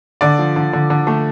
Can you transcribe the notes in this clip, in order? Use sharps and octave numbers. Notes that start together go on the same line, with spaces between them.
D3 D5
F3
D3
D3
D3
A3